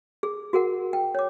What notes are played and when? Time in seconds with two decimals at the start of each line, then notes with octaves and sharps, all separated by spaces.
0.23 G#4
0.53 F#4 G#4 A#4 F#5
0.93 G5
1.15 C#5 D6